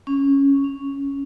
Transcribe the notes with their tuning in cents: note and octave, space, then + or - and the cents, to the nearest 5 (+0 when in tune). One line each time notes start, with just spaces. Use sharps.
C#4 +0
C#4 +5